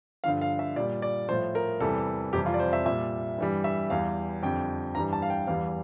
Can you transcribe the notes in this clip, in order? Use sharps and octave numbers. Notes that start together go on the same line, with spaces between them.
G2 D3 F3 F5
F5
E5
A#2 G3 D5
D5
A2 F3 C5
A#4
E2 C3 E3 G3 A4
F2 C3 E3 G3 G4
F4
D5
C5
E5
A#2 G3 E5
G2 E3 G3
E5
E2 E3 G3 F5
F2 D3 G3 G5
G2 E3 G3 A#5
A5
F5
G5
E2 E3 G3 F5